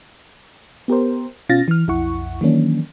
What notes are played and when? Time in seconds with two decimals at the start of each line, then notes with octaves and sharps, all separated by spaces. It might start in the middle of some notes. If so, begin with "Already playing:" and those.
0.88 B3 G4 A#4 C5
1.49 B2 C#4 F4 F5 A6 A#6
1.68 E3 F6
1.88 B1 F2 E4 F#5 C#6
2.41 D#3 E3 F#3 A#3 C#4 D4